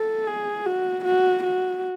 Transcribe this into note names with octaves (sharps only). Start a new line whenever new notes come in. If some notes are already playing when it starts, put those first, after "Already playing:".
Already playing: A4
G#4
F#4
F#4
F#4